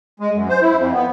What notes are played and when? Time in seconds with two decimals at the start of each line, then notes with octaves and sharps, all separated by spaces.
0.20 G#3
0.33 F#2
0.49 C5
0.61 E4
0.77 F2
0.93 B3